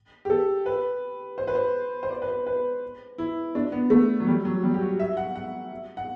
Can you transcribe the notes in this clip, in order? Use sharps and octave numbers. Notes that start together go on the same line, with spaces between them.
G4
A4
B4
C5
B4
C5
C5
D5
B4
C5
B4
E4
D4
B3
A3
F#3
G3
F#3
G3
G4
F#4
E5
F#5
F#5
F#5